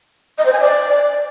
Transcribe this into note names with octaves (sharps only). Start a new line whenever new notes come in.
D#5
C5
G#5
D5